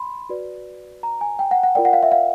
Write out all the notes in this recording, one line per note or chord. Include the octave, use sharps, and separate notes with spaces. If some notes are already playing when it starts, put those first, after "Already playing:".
Already playing: B5 C6
F#4 B4 D5
A#5
G#5
G5
F#5
F#5
F4 A#4 D5 G5
F#5
F5
E5
F5